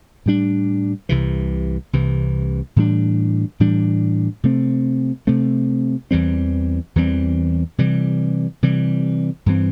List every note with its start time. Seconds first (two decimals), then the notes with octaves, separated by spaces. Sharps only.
0.26 A2 G3 D4
1.09 C2 C3 E3
1.93 C2 C3 E3
2.76 A2 E3 G3 D4
3.60 A2 E3 G3 D4
4.43 C3 A3 C4
5.27 C3 A3 C4
6.11 E2 E3 G3 C4
6.96 E2 E3 G3 C4
7.78 C3 E3 G3
8.63 C3 E3 G3
9.46 G2 E3 C4